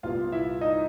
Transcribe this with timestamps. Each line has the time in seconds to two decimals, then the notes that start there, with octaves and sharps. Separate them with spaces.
0.03 C2 A#2 G3 B3 F4 F5
0.32 E4 E5
0.61 D#4 D#5